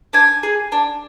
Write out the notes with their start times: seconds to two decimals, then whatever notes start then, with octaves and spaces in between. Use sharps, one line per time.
0.13 D4 G#5
0.43 G#4
0.72 D4